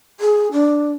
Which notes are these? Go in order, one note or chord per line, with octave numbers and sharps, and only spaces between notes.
G#4
D4